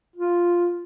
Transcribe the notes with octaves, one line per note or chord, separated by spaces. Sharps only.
F4